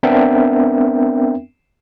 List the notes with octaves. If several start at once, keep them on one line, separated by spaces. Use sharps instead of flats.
B3 C4 D4 A#4 E5 G5